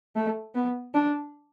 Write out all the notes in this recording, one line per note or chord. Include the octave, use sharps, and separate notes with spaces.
A3
B3
D4